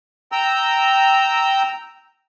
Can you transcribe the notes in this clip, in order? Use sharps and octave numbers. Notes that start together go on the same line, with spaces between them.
G5 A#5 E6